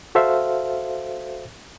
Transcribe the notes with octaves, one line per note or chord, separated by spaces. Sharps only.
F#4 A4 C5 E5 F5